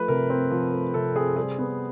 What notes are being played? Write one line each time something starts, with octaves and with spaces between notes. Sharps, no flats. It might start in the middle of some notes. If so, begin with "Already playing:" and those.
Already playing: F3 A3 B4
C3 A#4
C4
F3
A3
C3 A4
C4 G#4
G3 G#4
B3